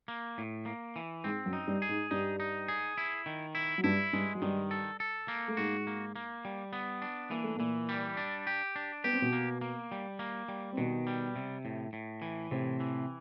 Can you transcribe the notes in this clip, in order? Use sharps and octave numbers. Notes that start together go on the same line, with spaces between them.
A#3
A2
A#3
E3
G#2 G#3 C4
F#2 F#3
D#4
G2 G3
G#4
G#2 G#3
G2 G3 D#4
D#4
G#4
E4
D#3
E4
F#3
G2 G3 E4
G2 G3 G#3
F#3
G2 D#3 G3
A4
A4
A#3
A3
G#2 G#3 F#4
A#3
A#3
G3
B3
D4
E3 A#3
A3
A#2 E3 A#3
G3
D4
G4
D4
B3 G4
C4
B2 B3
A#3
A#3
G3
A#3
G3
C4
B2 D#3 B3
G3
C3
A2
A2
E3
A2 C3 C4
E3